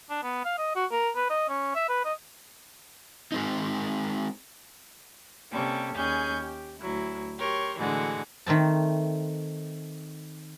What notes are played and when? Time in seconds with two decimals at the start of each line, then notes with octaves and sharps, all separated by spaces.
0.10 D4
0.23 B3
0.45 F5
0.58 D#5
0.75 F#4
0.91 A#4
1.16 B4
1.30 D#5
1.49 C#4
1.75 E5
1.89 B4
2.05 D#5
3.32 G#3 C4 D#4
5.52 C3 G3 A#3 C#4 A4
5.95 D#2 C#4 G#4 G#5 G6
6.43 G4
6.79 D2 F#3 E4
7.39 G4 A#4 C#5 C6
7.78 A2 D3 E3 G#3 F#4 F#5
8.46 D#3 A3 C4 A5